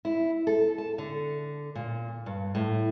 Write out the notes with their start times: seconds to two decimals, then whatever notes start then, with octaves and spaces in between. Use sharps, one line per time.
0.05 E4
0.47 A4
0.78 A5
0.98 D3
1.75 A#2
2.26 G2
2.55 A2